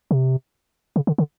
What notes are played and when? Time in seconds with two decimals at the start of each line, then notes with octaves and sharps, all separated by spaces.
0.11 C3
0.96 C#3
1.07 D3
1.18 D3